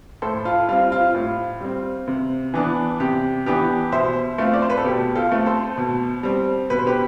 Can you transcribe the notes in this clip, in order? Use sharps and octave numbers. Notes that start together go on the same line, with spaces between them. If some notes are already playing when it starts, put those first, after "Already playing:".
A2 A4 C5
F4
G3 C4 F4
F4
A2 F4
G3 C4
C3
E3 B3 D4
C3 G4
E3 B3 D4 G4
B2 C5 E5
A3 C4 F4
D5
C5
B4
A4
B2 G4
F4 A4
A3 C4
A4 C5
B2
G3 C4
B2 B4
C5
G4 B4